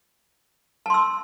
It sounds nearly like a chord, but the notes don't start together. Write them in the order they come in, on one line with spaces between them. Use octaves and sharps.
A5 C6 E6